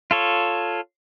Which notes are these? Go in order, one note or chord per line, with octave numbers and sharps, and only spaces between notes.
F4 A4 C#5